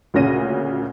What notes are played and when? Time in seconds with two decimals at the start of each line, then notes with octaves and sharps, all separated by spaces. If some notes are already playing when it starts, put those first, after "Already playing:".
0.14 D2 A#2 C#3 A#6 D#7